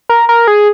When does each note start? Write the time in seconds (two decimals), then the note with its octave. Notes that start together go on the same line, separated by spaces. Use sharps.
0.09 A#4
0.29 A#4
0.48 G#4